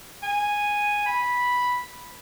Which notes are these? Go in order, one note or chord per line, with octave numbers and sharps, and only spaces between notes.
G#5
B5